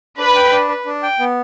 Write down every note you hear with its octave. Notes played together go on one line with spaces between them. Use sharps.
D4 B4
G5
D4
B4
D4
G5
B3